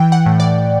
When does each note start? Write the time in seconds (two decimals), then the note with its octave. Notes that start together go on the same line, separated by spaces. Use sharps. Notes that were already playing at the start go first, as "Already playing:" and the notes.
Already playing: E3 G5
0.12 F#5
0.26 A2
0.40 D5